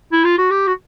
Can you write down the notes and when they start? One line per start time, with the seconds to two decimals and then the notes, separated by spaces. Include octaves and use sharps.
0.12 E4
0.24 F4
0.38 F#4
0.50 G4
0.67 F#4